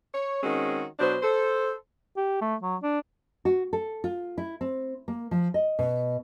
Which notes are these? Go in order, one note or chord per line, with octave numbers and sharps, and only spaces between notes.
C#5
D#3 G#3 C4 C#4 F#4
B2 F#3 D4 C5
A4 C5
G4
A3
F#3
D4
F#4
A4
F4
E4
C4
A#3
F3
D#5
B2